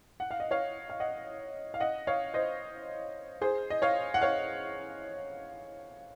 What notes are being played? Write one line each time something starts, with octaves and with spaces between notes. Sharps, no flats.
F#5
F5
D#5
C#5 F5
F5
D#5 F#5
F5
D#5 F#5
C#5 F5
C5 D#5
G#4 C5
D#5
C#5 F5
F#5
C#5 F5